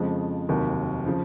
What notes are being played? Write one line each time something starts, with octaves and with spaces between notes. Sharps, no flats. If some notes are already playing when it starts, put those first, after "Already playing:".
Already playing: F2 C#3 F3 G#3
F1 D#2 D#3 F#3
C#3 F3